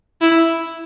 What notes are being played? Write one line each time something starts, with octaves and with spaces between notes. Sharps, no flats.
E4